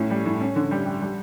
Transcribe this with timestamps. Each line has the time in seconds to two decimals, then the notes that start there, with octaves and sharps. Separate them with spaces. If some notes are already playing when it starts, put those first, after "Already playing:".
Already playing: A2 C#4
0.10 G3
0.25 A2
0.41 C#4
0.56 D3
0.71 G3
0.86 G4
1.02 G3